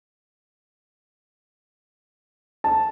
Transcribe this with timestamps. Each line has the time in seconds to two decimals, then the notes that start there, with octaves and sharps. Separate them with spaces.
2.64 A5